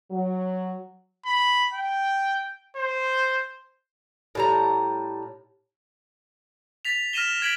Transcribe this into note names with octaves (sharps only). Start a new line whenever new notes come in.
F#3
B5
G5
C5
A2 G3 A#5
A6 B6 F7
F6 A#6 B6 D#7 E7 G7
G#6 B6 D7 F#7